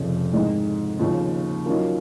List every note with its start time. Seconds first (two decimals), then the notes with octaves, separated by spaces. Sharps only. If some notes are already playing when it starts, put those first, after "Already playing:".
Already playing: F1 F2 C#3
0.33 G#2 D#3 G#3
0.99 D#2 C#3 F3
1.65 D#3 F#3 C#4 F4 A#4